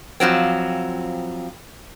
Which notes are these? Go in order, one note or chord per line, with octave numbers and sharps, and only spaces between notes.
F2 F3 F#3 C4